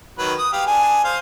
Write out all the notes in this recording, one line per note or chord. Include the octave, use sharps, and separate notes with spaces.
D#3 F#3 B4
D#6
G4 F5
D4 G#4 G#5
C5 F5